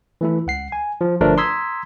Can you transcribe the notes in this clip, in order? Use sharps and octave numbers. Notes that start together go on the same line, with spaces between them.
E3 A3 E4
C#2 F#5 C7
G#5
F3
G1 F3 A3 D4 A#4 B4
A#5 C6 D#6 E6 G#6 B6